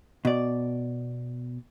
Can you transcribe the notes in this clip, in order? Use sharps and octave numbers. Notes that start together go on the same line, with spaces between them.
B2 D5